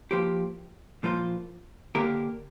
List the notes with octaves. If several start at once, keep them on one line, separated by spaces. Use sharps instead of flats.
F3 A#3 G4 C5
A#2 F3 A#3 F4 C5
D3 A#3 D4 G4 A#4